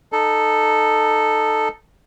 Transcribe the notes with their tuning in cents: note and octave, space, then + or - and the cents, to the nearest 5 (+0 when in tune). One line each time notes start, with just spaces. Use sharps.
D#4 -15 A4 +0